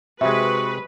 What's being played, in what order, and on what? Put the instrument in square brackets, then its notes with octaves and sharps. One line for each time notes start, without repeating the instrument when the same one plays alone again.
[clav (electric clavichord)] C3 G#3 [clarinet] F#4 [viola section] B4 [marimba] E5